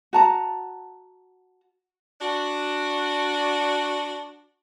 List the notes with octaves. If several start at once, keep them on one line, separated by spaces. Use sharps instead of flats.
F#4 A5 A#5
D4 F#4